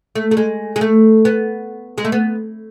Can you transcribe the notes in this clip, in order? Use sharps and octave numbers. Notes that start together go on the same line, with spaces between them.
A3
A3
G#3
G#3
A3
B3
G#3
A3
B3